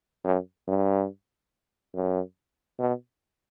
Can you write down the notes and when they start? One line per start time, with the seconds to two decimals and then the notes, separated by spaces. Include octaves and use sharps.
0.24 F#2
0.68 G2
1.95 F#2
2.79 B2